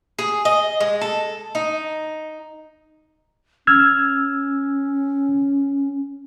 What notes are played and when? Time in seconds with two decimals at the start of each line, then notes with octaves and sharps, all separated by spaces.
0.19 G#4
0.45 D#5
0.80 G#3
1.01 A4
1.55 D#4
3.67 C#4 E6 F6 G#6